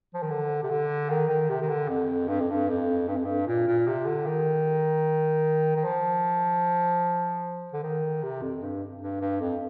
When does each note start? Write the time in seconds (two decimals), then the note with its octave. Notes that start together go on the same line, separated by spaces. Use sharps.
0.14 F3
0.22 D#3
0.30 D3
0.63 C3
0.70 D3
1.10 D#3
1.29 D#3
1.49 C3
1.61 D#3
1.69 D3
1.89 F2
2.28 G2
2.40 F2
2.50 G2
2.68 F2
3.08 G2
3.16 F2
3.25 G2
3.47 A#2
3.67 A#2
3.87 C3
4.06 D3
4.26 D#3
5.77 D#3
5.84 F3
7.73 D3
7.83 D#3
8.23 C3
8.42 F2
8.62 G2
9.01 G2
9.21 G2
9.40 F2